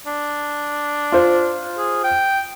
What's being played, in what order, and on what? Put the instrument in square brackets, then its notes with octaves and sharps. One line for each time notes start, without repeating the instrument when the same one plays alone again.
[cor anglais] D4
[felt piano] F4 C5
[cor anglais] G#4
G5